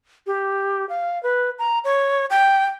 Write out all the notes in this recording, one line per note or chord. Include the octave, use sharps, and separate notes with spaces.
G4
F5
B4
A#5
C#5
G5